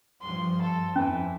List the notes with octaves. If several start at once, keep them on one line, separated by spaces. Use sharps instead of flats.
G2 F3 C6
A4
F2 E3 C#4